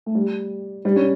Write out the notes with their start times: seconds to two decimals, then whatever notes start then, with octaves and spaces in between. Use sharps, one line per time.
0.06 A3
0.15 G3
0.85 G3
0.96 C#4